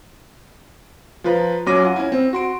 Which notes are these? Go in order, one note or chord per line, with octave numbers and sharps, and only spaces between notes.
F3 F4 B4 A#5
F#2 F#3 C#4 D6 A#6 D#7
F4 F#5
C#4 E4
C4
F#4 C6 D7